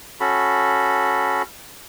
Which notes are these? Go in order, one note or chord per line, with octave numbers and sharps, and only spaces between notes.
C#4 F#4 A4 B5